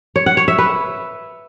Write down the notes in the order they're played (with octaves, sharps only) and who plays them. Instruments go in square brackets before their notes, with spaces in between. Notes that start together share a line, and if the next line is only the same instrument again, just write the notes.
[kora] C#5
F#5
C#5
E5
B4